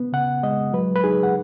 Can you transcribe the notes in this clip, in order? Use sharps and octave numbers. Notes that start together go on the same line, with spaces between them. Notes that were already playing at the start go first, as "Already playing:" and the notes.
Already playing: B3
C#3 F#5
G#3 D#5
F#3 B4
B4
D#4 G#4
F#5